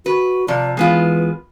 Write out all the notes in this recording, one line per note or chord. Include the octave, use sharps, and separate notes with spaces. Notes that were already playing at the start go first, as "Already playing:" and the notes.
F#4 B4
C3 F3 D5
E3 G#3 B3 F4